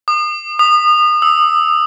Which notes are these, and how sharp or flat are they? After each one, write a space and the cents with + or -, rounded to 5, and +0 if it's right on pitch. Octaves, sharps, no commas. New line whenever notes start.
D#6 -40
D#6 -30
E6 -20